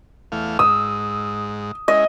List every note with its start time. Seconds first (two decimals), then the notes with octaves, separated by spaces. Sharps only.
0.32 E2 A3 F5
0.59 G#2 D#6 E6
1.88 G#3 C#4 E4 D#5